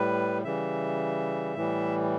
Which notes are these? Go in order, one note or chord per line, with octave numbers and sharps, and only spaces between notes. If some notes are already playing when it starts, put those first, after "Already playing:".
Already playing: A2 G3 B4
C#3 E3 G3 E5
A2 E3 G3